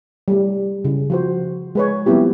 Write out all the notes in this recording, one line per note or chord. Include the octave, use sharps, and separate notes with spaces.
G3 A3
C#3
F3 F#4 C5
G#3 B4 C#5
F3 G3 B3 C4 E4 G4